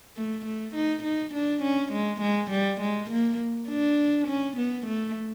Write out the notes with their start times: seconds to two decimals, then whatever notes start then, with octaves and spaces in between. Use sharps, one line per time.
0.16 A3
0.46 A3
0.75 D#4
1.03 D#4
1.34 D4
1.63 C#4
1.93 G#3
2.21 G#3
2.51 G3
2.81 G#3
3.11 A#3
3.68 D4
4.28 C#4
4.57 B3
4.87 A3